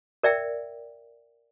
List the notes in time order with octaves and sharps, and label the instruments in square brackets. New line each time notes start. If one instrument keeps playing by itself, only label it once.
[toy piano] A#4 D5 E5 G5